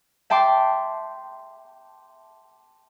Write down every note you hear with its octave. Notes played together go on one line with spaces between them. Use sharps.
E5 G5 A5 C6 D6